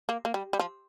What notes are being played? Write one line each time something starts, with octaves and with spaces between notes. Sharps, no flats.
A#3
A#3
G3
G3
F3